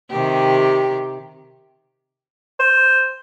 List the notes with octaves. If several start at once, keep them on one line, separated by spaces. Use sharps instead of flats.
C3 D#3 G4
C5